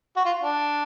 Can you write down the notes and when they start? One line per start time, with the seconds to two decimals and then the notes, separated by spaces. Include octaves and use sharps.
0.16 F#4
0.25 F4
0.42 D4